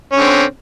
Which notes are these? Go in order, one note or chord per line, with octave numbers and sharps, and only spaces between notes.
D3 C4 C#4